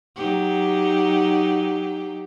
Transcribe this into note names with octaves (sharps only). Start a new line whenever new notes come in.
F#3 D#4 G4